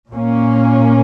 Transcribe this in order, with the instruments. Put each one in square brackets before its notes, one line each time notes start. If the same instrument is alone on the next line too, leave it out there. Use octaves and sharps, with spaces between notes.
[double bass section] A#2 A#3 C#4